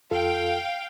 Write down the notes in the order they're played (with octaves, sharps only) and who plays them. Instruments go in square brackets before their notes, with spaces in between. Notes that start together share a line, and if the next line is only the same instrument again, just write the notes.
[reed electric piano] F2 F4 A4 [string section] F5 G5